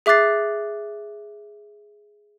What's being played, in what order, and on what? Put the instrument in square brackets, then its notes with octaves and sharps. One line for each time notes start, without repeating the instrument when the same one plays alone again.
[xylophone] G#4 E5 D6 F#6 A6 C7